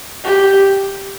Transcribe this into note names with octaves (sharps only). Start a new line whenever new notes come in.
G4